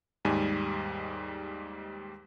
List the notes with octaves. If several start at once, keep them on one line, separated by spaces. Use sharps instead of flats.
D#2 G#2 G3 G#5